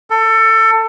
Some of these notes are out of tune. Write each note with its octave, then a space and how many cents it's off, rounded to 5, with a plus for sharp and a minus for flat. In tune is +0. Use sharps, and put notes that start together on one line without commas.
A4 +25